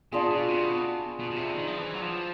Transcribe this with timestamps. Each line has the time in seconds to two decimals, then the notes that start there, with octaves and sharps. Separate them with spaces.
0.12 B2 D4 F4 G#4
0.30 B2
0.49 C3
0.65 B2
1.19 B2
1.30 B2
1.36 C3
1.54 D#3
1.68 F3
1.78 E3
1.94 F#3
2.02 F3